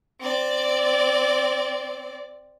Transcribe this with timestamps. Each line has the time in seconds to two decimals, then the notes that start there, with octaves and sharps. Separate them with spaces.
0.21 C4 D5